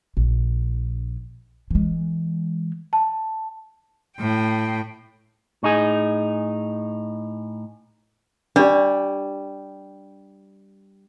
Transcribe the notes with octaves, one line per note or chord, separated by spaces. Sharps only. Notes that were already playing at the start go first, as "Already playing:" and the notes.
A#1
E3 G#3
A5
A2 G5
A2 D#4 G#4
G3 D4 G4